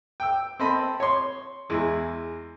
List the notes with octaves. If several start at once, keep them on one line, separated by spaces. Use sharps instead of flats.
G5 E6
C4 A4 D#5 B5
C#5 C6
E2 G#3 E4